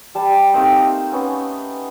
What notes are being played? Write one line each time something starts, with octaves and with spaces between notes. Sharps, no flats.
G3 A5
A3 A#3 C4 D#4
B3 C#4